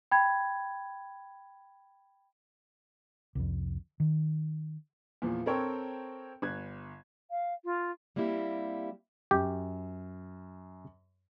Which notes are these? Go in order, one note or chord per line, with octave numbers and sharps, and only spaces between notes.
G5 B5 G#6
C2 F2
D#3
E2 A#2 E3 F3
C4 A4 A#4 C5 C#5 G5
G1 F#6 G#6
F5
F4
G3 A#3 C4 E4 G4
F#2 G4